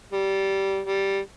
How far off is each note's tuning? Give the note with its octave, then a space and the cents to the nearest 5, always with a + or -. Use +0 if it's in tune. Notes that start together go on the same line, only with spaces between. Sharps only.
G3 -15
G3 -5